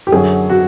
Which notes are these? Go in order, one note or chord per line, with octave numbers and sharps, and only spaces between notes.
G4
F#2 D3 F#3 G#4
F#4